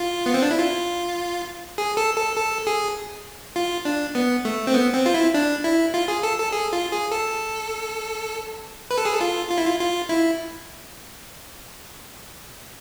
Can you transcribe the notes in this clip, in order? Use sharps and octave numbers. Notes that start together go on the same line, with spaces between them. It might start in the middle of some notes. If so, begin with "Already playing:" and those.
Already playing: F4
B3
C4
D4
E4
F4
G#4
A4
A4
A4
G#4
F4
D4
B3
A3
C4
B3
C4
F4
E4
D4
E4
F4
G#4
A4
A4
G#4
F4
G#4
A4
B4
A4
G#4
A4
F4
F4
E4
F4
F4
E4